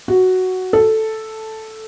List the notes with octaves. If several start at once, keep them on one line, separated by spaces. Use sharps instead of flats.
F#4
A4